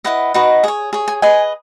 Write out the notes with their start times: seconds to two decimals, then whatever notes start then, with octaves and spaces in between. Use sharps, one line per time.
0.04 E4 B4 D#5 F#5
0.34 D#4 F#4 B4 D#5
0.64 G#4 C#5
0.93 G#4 C#5
1.08 G#5
1.22 G#4 B4 D#5 G#5